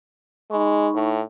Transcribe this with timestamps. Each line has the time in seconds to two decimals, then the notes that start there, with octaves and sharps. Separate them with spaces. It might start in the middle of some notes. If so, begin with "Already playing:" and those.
0.51 G#3 D#4 B5 C#6
0.95 A2